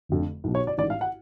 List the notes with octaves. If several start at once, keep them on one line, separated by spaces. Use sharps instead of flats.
F1 F2 D3
B1 B2
C#5
D5
A1 G#2 D5
F5
F#5